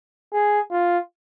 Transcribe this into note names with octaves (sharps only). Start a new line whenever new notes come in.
G#4
F4